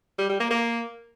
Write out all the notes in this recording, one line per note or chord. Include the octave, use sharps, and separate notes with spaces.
G3
G3
A#3
A#3